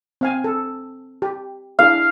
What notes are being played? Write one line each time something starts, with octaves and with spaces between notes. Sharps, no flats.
C4 F5 G#5
A4
G4
D4 E4 G#4 F5